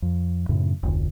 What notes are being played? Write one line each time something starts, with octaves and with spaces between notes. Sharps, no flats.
F2
F#2 A2 C#3
F1 D2